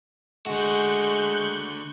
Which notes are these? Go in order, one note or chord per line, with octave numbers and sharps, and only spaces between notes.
D3 G#3 F#4 C#6 F#6 G6